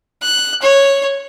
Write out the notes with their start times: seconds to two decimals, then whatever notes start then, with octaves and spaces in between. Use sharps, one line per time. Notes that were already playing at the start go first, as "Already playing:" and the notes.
0.22 F#6
0.62 C#5